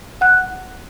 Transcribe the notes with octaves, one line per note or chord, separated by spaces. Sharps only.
F#5 F#6